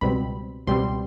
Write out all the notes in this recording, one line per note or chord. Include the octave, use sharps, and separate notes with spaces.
C#2 B2 G3 C4 B5
C#2 B2 G3 C4 C6